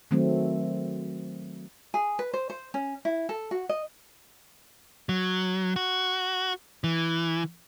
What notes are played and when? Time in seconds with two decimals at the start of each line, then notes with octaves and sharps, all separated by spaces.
0.11 D#3 F#3 A3 C4
1.94 G#4
2.19 B4
2.33 C5
2.50 C5
2.74 C#4
3.05 E4
3.29 A4
3.51 F#4
3.69 D#5
5.09 F#3
5.76 F#4
6.84 E3